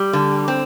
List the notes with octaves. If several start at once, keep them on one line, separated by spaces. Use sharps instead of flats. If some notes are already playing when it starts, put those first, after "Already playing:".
Already playing: G3
D3
C4